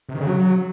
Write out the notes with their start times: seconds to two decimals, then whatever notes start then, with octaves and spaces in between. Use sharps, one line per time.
0.09 C3
0.15 D#3
0.21 C#3
0.27 F#3